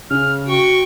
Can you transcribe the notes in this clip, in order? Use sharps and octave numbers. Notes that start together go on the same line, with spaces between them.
C#3 F6
F#4 G5 C#6